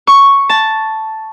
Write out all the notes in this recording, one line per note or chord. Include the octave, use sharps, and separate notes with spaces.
C#6
A5